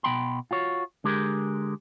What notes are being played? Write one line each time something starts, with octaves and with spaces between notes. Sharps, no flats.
B2 A#3 G5 B5 C6
F4 F#4 C#5
D3 G#3 G4 G#4 A#4